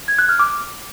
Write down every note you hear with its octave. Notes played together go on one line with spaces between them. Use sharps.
G#6
F#6
F6
D6